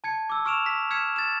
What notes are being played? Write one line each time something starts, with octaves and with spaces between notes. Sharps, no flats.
A5 G#6 C#7
D6 E6
C#6 F6 D7 E7 F7
B6
F6 G#6 B6 C#7 E7
A6 E7